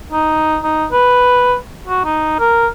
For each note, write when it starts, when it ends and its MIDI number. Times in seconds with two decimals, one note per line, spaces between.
0.12 0.58 63
0.64 0.86 63
0.92 1.55 71
1.88 2.04 66
2.05 2.38 63
2.39 2.67 70